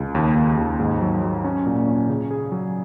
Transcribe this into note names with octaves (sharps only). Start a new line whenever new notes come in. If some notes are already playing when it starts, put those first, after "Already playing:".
Already playing: C#2
D#2
D#2
D#2
G#2
F#3
F#3
C#4
A#2
C#4
C#3
G#4
F#3